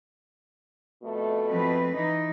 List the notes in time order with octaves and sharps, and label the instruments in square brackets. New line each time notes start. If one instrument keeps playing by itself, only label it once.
[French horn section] F2 B2 A3
[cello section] F3 C4 B4
E3 D#4